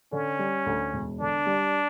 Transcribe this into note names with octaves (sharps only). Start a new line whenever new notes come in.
D3 C#4
G3
D2
E1
D3 D4
G3